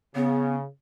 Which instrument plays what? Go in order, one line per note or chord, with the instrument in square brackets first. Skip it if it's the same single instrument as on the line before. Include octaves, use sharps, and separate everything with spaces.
[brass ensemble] C#3 [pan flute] B3